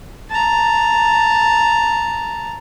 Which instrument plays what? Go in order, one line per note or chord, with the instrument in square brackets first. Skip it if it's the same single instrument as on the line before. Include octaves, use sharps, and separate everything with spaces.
[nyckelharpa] A5 A#5